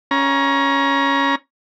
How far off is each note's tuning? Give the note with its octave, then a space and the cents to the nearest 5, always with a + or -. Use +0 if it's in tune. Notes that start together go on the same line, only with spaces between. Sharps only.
C#4 +5 A#5 +30